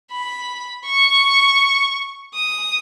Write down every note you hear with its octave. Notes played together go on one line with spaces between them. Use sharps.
B5
C#6
D#6